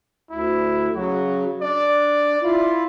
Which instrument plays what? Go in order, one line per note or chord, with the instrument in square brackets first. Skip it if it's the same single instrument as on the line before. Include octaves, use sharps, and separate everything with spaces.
[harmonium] D2 [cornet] E4
[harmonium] C#3 F#3 [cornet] F#4
[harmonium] D4 [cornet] D5
[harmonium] E4 F4